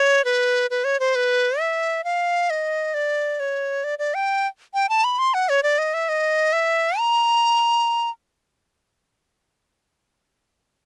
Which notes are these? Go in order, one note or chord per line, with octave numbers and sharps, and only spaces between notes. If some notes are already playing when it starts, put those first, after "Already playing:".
Already playing: C#5
B4
B4
C#5
C5
B4
E5
F5
D#5
D5
C#5
D5
D5
G5
G5
A5
B5
C6
F#5
C#5
D5
D#5
E5
D#5
E5
A#5